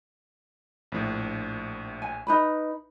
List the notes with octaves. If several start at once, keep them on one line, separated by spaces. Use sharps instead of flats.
A#1 A2
G#5
D#4 B4 B5